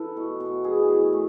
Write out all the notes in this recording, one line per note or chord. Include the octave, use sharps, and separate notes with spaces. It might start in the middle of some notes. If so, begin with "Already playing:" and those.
Already playing: E3 A4 B4
B2
B2
E3 G#4
A2
A2